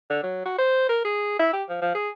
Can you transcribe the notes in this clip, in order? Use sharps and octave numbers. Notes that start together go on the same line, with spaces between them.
D3
F#3
F#4
C5
A#4
G#4
E4
G4
F3
F3
G#4